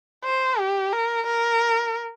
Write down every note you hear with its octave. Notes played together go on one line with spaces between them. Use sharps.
C5
G4
A#4
A#4